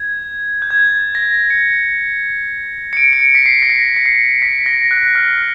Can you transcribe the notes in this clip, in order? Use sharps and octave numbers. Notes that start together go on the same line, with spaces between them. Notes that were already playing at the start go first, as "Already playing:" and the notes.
Already playing: G#6
G6
G#6
A6
A#6
C#7
C#7
D7
C#7
D7
B6
C7
A#6
B6
C#7
C7
B6
A#6
F#6
F6